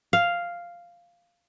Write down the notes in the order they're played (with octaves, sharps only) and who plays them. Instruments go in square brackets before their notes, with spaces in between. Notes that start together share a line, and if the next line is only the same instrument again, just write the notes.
[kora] F5